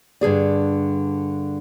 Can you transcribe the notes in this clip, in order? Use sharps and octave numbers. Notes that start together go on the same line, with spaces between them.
G2 D3 G#4 D5